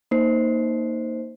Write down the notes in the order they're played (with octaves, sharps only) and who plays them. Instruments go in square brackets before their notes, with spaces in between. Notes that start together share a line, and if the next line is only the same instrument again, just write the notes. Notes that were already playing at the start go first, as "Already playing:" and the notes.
[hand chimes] A#3 D#4 C5 C7